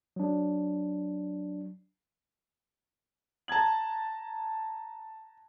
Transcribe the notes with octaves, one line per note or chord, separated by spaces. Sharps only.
F#3 D4
A5 A#5 G#6 F#7